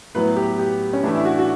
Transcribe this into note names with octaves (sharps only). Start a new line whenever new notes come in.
A2 F#3 B3 B4
G4
G4
C#4
A2 E3 A3 D4
E4
F#4
F#4